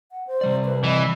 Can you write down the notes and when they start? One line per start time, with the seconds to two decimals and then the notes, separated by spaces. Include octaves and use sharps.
0.12 F#5
0.27 C5
0.41 C3 G3 D5
0.65 B4
0.84 E3 D#5